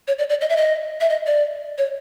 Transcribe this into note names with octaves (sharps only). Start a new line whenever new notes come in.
C#5
D5
D5
D#5
E5
D#5
E5
D#5
D5
C#5